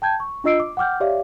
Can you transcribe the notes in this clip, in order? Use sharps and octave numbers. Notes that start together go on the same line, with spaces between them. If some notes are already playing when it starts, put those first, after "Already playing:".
G5 A5 G6 G#6
C#6
D4 F4 D#5 E6 C7 D7
D6
F#5 G5 D6 F6 G6
G4 C#5 D5 E5 F5 D6